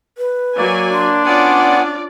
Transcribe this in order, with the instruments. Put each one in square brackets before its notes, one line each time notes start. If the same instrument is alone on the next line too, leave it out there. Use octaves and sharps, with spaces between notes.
[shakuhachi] B4
[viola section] F#3 G#5 [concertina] A#3 D5
[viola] D4 [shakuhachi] C6
[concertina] B3 F#5 G#5 [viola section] C#4 F4 D5